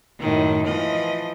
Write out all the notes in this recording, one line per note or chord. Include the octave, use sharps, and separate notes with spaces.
F#2 A2 D#3
E3 F3 D#5